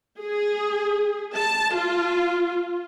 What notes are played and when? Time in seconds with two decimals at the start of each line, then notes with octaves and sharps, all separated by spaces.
0.20 G#4
1.35 A5
1.74 F4